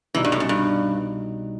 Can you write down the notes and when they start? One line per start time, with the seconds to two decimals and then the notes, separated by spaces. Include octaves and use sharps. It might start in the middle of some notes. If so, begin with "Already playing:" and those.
0.14 C2 B2 E3 G3 D#4
0.24 G2
0.32 A2
0.40 F#2
0.49 G2